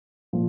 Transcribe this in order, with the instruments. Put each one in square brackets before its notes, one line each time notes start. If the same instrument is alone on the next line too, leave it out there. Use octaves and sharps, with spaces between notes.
[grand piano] A#2 F3